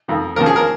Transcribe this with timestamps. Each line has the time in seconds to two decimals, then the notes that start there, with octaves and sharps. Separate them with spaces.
0.08 F2 D#3
0.36 D#2 C#3 F3 A#4
0.46 G#4
0.56 A#4